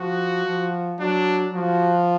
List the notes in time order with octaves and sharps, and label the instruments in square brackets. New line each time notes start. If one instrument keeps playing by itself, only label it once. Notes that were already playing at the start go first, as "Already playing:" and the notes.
Already playing: [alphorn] F3 [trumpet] F#4
[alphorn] F3
[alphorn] F#3 [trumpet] D4
[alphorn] F3 [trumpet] F#4